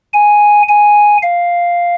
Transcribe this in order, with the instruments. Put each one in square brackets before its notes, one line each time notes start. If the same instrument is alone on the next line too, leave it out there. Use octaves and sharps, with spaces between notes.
[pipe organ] G#5
G#5
F5